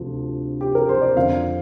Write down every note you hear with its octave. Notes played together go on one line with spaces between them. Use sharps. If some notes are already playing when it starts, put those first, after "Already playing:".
Already playing: D2 C3 F3
G4
A#4
C5
D5
F2 D3 F3 C4 F4 F5